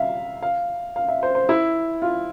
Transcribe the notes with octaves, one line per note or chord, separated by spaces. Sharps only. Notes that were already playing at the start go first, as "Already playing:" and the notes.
Already playing: E5 F5
F5
F5
E5
C5
C5
E4
F4